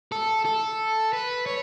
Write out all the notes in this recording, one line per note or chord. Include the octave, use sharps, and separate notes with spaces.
A4
A4
B4
C#5